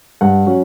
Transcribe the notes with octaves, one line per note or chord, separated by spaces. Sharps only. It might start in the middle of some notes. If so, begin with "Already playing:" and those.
G2 F#5
F#3 C#4